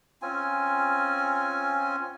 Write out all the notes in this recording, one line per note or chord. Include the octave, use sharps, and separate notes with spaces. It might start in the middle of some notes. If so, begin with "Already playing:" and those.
C4 C#4 F4 G#5